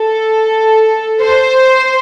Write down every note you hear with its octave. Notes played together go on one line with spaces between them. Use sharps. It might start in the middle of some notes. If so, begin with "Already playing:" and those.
Already playing: A4
C5